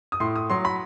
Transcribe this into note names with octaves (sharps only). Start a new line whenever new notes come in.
D#6
A2 C6
D#6
F#3 C6
B5